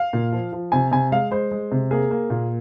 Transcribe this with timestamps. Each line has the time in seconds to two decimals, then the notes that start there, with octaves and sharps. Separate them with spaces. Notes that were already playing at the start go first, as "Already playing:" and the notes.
Already playing: F5
0.13 A#2
0.32 F3
0.52 F3
0.72 C3 G#5
0.91 C3 G#5
1.11 G#3 F5
1.31 G#3 C5
1.51 G#3
1.72 C3
1.91 A#3 G#4
2.11 A#3
2.30 A#2